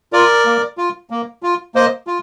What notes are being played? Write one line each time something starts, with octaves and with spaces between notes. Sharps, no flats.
F4 A#4 D5
A#3
F4
A#3
F4
A#3 C5 D#5
F4